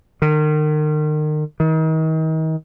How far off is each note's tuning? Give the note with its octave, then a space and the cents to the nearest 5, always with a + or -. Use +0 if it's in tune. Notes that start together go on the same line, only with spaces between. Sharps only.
D#3 -35
D#3 +35